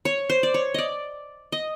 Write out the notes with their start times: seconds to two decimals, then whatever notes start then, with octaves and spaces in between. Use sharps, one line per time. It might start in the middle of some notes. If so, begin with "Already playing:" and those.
0.05 C#5
0.30 C5
0.43 D5
0.54 C#5
0.74 D5 D#5
1.52 D#5